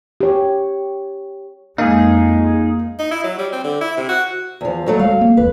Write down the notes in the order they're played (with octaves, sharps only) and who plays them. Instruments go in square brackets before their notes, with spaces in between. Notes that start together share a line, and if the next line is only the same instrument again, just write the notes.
[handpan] G4 C#5
[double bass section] F2 G#3 [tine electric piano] A#3 F5 [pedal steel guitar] D#4 G#4
[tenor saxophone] D#4
E4
F#3
G3
C4
D3
E4
C3
F#4
[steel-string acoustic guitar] E2 F3
F2 F#3 A3
[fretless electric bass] G3 G#3 [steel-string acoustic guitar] F5
[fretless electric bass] G3 A#3
[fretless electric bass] E1 C2 F2 [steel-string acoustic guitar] B4